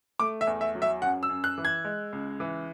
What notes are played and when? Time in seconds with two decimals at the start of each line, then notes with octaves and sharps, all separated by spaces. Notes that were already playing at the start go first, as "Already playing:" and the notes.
0.19 A3 D6
0.41 E5
0.47 E2
0.61 E5
0.75 F#3
0.82 E5
1.02 F#2 F#5
1.23 E6
1.29 F#2
1.44 F#6
1.58 E3
1.65 G#6
1.85 G#3
2.13 C#2
2.40 E3